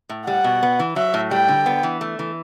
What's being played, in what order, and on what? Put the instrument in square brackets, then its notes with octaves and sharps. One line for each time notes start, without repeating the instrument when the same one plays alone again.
[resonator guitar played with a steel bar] A2
[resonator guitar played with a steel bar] G3 [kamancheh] F#5
[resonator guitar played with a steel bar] B2
B3
E3
[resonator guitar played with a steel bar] F#3 [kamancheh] E5
[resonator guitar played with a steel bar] A2
[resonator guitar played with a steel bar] G3 [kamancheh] G5
[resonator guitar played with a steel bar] D3
B3
E3
A3
E3